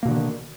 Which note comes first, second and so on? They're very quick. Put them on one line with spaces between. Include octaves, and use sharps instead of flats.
A#3 B2 D3 D#3